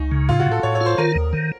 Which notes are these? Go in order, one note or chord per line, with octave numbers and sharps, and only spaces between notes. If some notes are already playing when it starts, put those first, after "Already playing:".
Already playing: C#2 D#4
C#3
A2 F4
F#4
A2
A4
A2 C#5
C#5
F4
C5
D#3 A#4
D#2
D#3